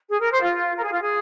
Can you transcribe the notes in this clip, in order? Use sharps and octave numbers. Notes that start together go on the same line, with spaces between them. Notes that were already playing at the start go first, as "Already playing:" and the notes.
G#4
A#4
C5
F4
A#4
G#4
F4
G#4